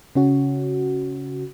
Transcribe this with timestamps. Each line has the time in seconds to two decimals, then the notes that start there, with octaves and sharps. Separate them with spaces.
0.15 C#3 C#4 F#4